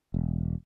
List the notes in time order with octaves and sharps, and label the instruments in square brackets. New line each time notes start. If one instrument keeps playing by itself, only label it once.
[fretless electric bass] E1